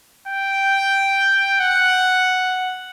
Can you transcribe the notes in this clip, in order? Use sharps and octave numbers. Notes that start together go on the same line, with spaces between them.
G5
F#5